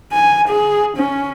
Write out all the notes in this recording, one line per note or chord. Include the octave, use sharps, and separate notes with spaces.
G#5
G#4
C#4